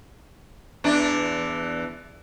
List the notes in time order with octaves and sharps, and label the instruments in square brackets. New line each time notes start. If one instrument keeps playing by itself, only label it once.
[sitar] E2 E3 D4